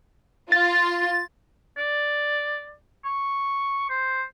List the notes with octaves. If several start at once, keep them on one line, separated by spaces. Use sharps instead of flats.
F4 A6
D5
C#6
C5